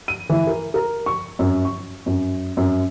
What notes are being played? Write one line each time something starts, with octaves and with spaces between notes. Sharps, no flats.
D#7
E3
A#4
A#4
C#6
F#2
C#6
F#2
F#2